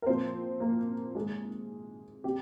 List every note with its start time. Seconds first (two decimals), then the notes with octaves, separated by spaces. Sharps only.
0.02 A#4
0.06 A#2 F3 C4 C5
0.60 A#3 A#4
1.15 C3 D#3 G#3 G#4
2.24 C3 G4